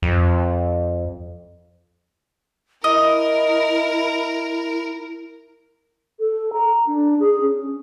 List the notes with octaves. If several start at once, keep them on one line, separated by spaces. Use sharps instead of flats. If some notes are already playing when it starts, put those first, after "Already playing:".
F2
E4 A#4 D#5
A4
A#5
D4
G#4
C#4